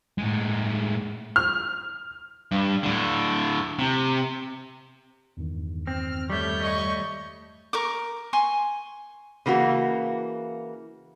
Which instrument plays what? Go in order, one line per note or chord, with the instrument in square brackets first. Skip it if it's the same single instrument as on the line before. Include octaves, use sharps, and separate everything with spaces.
[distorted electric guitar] A2 G#3
[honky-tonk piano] F6
[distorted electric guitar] G2
A2 D3
C3
[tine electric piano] E2 G2 D#3
[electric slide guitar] C4 [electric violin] F6
[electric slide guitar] G3 A3 [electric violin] C#5 G6
[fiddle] D#5 C#6
[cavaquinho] A#4 C#6 D6
G#5 C6 C#6
[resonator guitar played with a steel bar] C#3 E3 A#3 F#4